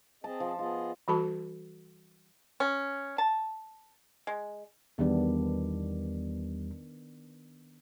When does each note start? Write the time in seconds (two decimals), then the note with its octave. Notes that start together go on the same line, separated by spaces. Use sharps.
0.24 C4 G#4 D#5 A5
0.40 F3
0.59 B3 F4 G#4 D#5
1.08 E3 G3 F#4 A4 A5 B5
2.60 C#4
3.18 A5
4.27 G#3
4.98 E2 D#3 G3 B3 D4